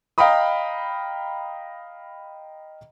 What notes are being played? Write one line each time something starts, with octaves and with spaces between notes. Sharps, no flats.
D#5 F5 G5 A#5 B5 D#6